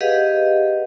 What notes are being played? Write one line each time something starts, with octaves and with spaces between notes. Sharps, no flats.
G4 G#4 B4 D#5 F5 F#5